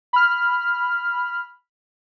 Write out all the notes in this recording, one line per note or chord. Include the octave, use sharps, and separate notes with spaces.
B5 F6